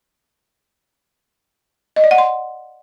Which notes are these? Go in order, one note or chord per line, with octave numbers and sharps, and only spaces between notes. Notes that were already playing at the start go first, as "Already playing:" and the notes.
D#5
D5
F#5
C6